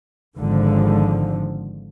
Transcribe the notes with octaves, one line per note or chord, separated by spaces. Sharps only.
G#1 G#2 D3 F3 G#3